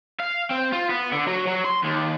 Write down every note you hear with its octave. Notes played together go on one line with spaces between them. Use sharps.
F5
C4
F4
B3
D3
F#3
F#3
C6
D#2